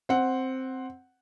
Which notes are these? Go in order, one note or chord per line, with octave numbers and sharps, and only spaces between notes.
C4 F#5